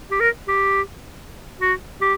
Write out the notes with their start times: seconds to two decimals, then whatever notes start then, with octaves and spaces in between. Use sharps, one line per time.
0.11 G4
0.20 A#4
0.48 G4
1.60 F#4
2.01 G4